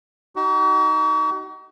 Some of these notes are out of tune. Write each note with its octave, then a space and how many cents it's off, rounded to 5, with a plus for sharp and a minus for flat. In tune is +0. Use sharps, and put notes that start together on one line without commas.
D#4 +0 F#4 +40